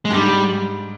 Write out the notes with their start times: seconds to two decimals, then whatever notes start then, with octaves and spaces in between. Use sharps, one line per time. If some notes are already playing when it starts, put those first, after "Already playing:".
0.05 G#3
0.10 G2
0.14 G#2 G3